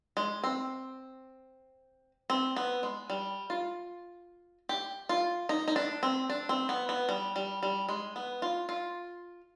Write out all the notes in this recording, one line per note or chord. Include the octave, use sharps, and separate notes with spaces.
G#3
C4
C4
B3
G#3
G3
F4
G4
F4
D#4
D#4
D4
C4
D4
C4
B3
B3
G3
G3
G3
G#3
B3
F4
F4